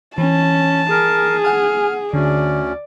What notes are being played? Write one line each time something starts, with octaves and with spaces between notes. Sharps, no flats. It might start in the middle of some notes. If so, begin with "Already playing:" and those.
E3 C#4 A5
G#4 A#4
F#5 G#5 F6
D2 D3 C#4 D5